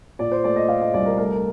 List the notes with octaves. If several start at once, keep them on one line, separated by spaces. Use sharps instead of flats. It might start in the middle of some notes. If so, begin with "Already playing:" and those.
A#2 D5
C5
A3 D5
D#5
A3 F5
D#5
C2 D5
A#4
A3 A#4